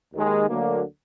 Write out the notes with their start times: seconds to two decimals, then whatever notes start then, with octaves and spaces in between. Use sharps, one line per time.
0.13 D#2 D#3 G#3
0.48 D2 D3 F#3 A#3